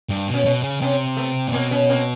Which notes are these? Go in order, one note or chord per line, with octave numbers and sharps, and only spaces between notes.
G2
B2
B3 C#4
B2
C#3
C3 B3 C#4
A3 B3
A#2
B2 A#3 C4
B3 C#4
A#3 C4